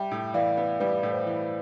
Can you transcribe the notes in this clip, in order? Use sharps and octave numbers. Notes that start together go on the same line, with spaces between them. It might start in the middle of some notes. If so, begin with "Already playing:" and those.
Already playing: G3 E5 G5
A2
E3 D5 F5
B3
G3 B4 D5
A2
C5
E3